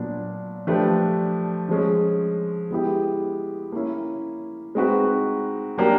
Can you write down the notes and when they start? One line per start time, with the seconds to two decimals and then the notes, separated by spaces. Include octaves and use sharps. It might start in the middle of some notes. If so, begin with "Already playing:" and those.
Already playing: A#2 F#3 B3 D4
0.67 F3 A3 D4 G4 B4
1.69 F3 G#3 C#4
2.71 G#3 B3 E4 G4
3.72 A#3 C#4 E4
4.75 G#3 C4 D#4 F#4 B4
5.78 F#3 A#3 D4 G4 A#4